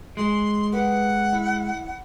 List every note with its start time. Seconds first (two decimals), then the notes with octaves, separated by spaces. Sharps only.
0.17 G#3 C6
0.72 G4 B4 F5 F#5
1.33 E4